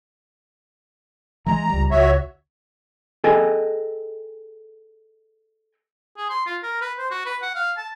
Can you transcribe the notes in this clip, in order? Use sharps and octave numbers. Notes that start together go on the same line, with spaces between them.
E3 G#3 A#5
C#2 G3
C#2 F#4 C#5 E5
G#4 A4 B4 D#5 G5 G#5
G#4
C6
F4
A#4
B4
C5
F#4
B4
F#5
F5
A5